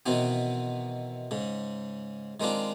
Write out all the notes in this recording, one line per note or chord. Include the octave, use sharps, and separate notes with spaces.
B2 D#3 E3 B3 C4
G#2 C#3
D#3 G#3 C4 D4 F4